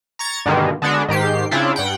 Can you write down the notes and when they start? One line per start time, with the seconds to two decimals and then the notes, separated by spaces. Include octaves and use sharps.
0.19 A#5 C#6 G#6 A6
0.46 G2 B2 D3 D#3 G#3 A#3
0.82 D3 G#3 B3 D4 F#4
1.08 G#2 D#3 G4 C7
1.51 C#3 C4 D4 E4 F4
1.76 G2 F#5 G5